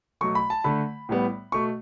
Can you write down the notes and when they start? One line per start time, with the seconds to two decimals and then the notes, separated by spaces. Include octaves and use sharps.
0.21 B2 F#3 A3 C#6
0.35 B5
0.50 A5
0.64 D3 A3 B5
1.09 A2 G3 B3
1.52 B2 A3 C#6